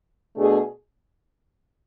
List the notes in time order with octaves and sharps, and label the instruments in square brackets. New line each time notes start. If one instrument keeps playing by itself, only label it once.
[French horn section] B2 A3 D4 G#4